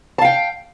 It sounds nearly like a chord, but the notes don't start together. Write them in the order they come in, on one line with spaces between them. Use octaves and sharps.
A5 F5 G5